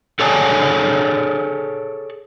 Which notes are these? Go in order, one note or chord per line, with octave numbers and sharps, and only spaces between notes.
G#4 A4 C#5 D5 G#5 A5